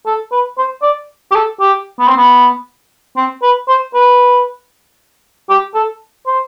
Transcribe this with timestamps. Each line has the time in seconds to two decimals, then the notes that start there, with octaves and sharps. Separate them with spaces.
0.06 A4
0.32 B4
0.58 C5
0.83 D5
1.32 G4
1.36 A4
1.61 G4
1.99 B3
2.08 C4
2.17 B3
3.17 C4
3.43 B4
3.68 C5
3.94 B4
5.50 G4
5.75 A4
6.27 C5